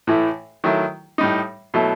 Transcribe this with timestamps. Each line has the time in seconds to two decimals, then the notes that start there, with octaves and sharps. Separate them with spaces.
0.07 A2 E3 A3 E4
0.64 D#3 F#3 A3 E4
1.18 A2 G3 D#4
1.74 B2 F#3 A3 E4